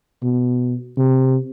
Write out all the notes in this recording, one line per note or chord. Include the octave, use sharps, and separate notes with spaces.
B2
C3